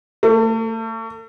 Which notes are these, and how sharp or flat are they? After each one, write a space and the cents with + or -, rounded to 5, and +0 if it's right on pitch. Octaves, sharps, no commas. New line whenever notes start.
A3 +35